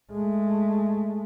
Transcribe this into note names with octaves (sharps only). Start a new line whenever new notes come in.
G#3 A3